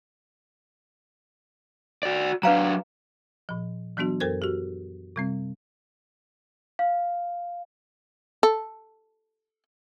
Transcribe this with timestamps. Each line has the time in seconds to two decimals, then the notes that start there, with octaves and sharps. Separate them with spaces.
2.03 F#4 D5
2.43 F#3 D4 B4 F5 A#5
3.49 A#2 F3
3.97 E3 F#3 B3 D4 F#4
4.20 F#2 A4 A#4 C5 G#6
4.42 F#4 G4
5.16 C3 G3 C4
6.79 F5
8.43 A4